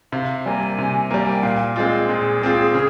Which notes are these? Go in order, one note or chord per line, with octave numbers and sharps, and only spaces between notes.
C3 F5
G3 A#3 G#5
C3
G3 A#3
G#5
G5
A#2 F5
G#3 C4 F4 D#5
A#2 G#4
G#3 C4 F4
C#3